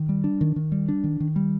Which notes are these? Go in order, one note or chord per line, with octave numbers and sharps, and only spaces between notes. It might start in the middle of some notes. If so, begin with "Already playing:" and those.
Already playing: D#3
G3
D4
D#3
D#3
G3
D4
D#3
D#3
G3